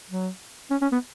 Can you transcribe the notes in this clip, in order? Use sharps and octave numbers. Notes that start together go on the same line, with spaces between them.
F#3
C#4
C#4
B3